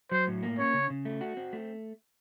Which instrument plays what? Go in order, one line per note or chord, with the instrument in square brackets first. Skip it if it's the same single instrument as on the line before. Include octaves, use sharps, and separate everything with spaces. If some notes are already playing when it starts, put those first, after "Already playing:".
[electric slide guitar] F#3 [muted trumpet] C5
[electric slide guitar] A2
A#3
[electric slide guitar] C#4 [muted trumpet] C#5
[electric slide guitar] C#3
C#3
A3
F#4
C4
A3